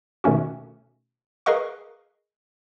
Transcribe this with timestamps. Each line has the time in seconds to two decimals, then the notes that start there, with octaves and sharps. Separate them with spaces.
0.24 B2 D#3 A3 C#4 F#4
1.46 G#4 A#4 B4 D#5 F5 C#6